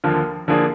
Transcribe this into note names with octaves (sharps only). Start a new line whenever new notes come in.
D#2 D3 F3 A#3 F4
D3 F3 A#3 D4 G#4